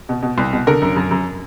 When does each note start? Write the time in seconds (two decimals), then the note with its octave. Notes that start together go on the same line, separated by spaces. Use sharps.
0.09 B2
0.22 B2
0.38 C2
0.53 B2
0.67 D3 A#4
0.82 F#2
0.96 F#2
1.11 F#2